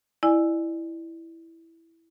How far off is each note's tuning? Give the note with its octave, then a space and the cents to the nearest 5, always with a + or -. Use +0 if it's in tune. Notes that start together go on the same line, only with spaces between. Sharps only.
E4 +0 D5 +35 G#5 +0